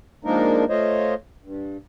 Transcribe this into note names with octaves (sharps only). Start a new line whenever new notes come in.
F3 G#3 A#3 D4 D#4 A#4
A3 F4 C5 C#5 D#5
G2